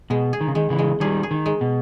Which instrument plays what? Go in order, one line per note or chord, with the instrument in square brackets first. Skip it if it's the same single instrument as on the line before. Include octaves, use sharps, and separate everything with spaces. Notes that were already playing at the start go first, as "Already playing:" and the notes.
[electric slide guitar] B2 [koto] G#3
[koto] G#4
[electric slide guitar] D#3
C#3
[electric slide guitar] D#3 [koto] G#3
[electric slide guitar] C#3 E3
[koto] G#3
[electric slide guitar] D#3 G3 [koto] G#4
[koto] G#4
[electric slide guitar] D#3
[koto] G#3
[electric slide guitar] B2